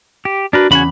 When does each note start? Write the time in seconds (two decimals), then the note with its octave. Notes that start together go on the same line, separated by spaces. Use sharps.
0.25 G4
0.53 D4 F#4 A#4 B4
0.71 E2 C#3 C#4 F#4 G#5 B5